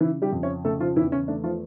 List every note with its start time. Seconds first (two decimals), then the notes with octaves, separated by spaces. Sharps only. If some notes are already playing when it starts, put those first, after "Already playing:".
0.01 C#3 E3 E4
0.22 G3 G4
0.32 F2
0.43 C#4 C#5
0.65 C#3 A3 A4
0.80 F3 F4
0.96 E2 E3 E4
1.12 C#4
1.28 A3 D4
1.44 F3 F4